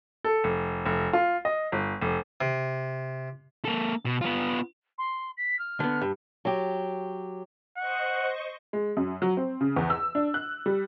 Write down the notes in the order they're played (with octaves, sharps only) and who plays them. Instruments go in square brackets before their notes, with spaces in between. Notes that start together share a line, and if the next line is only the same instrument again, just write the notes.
[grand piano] A4
F1
F1
F4
D#5
G1
F1
[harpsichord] C3
[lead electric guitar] A#3 A4
B2
B3 F4
[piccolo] C6
B6
F6
[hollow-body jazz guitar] D3 B3
G2
[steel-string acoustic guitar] F#3 G4
[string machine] C5 D#5 C#6 [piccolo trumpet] F#5
[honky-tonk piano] G#3
F#2
F#3
C4
C#3
E2
E6
D4
F#6
G3